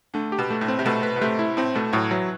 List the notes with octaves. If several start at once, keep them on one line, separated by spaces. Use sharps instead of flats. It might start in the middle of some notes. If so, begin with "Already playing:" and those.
D3 A3
G4
B2
A3
A2
C4
C3
B2 A3
B4
B2
C3 A3
E4
A2 C4
B2 A3
A2 F#3
E3 F#3